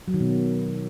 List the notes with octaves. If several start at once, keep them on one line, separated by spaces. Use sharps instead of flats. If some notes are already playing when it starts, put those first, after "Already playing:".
F#3
D#3
B2